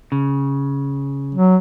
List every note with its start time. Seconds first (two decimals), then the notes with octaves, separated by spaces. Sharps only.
0.12 C#3
1.35 F#3